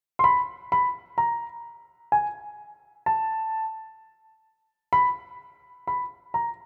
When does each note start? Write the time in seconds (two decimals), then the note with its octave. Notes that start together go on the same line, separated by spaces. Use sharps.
0.19 C6
0.24 B5
0.72 B5
1.18 A#5
2.12 G#5
3.06 A5
4.93 B5
5.87 B5
6.34 A#5